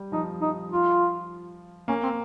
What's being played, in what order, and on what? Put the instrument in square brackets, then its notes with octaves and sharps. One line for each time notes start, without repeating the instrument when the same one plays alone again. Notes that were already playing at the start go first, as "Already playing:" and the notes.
Already playing: [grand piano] G3
[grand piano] F3 [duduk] D#4
[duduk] D#4
F4
[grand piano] A#3 [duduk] C#4
[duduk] C4